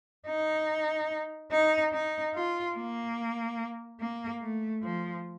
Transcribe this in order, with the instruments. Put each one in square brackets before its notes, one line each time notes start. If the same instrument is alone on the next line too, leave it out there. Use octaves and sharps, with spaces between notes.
[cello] D#4
D#4
D#4
F4
A#3
A#3
A3
F3